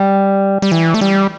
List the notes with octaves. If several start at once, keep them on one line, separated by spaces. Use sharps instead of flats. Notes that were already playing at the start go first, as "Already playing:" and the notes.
Already playing: G3
G3
E3
A3
G3